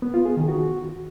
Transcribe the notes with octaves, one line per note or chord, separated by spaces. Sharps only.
B3
F4
G#4
D#3
F#4